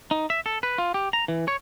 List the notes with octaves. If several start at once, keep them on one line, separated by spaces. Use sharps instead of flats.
D#4
E5
A4
B4
F4
G4
A#5
E3
C#5